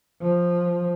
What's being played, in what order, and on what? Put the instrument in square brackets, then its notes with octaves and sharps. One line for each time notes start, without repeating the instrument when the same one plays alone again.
[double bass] F3